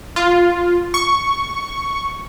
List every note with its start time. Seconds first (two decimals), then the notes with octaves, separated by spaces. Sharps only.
0.16 F4
0.94 C#6